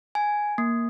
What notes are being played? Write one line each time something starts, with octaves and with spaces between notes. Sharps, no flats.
G#5
A#3